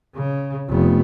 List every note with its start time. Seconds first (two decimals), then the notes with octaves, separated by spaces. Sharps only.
0.15 C#3
0.69 F1 B3